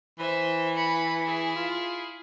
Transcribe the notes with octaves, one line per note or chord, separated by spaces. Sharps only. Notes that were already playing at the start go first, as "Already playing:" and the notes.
E3 C5 E5
B5 C#7
E4 G#4
F4